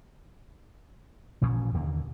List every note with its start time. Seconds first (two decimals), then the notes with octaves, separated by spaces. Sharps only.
1.41 A1 A#2 F3 C#4
1.74 D#2 D3 A#3